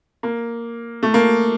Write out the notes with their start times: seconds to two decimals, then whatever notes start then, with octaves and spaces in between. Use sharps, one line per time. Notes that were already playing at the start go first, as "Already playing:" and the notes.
0.23 A#3
1.03 A3
1.14 A#3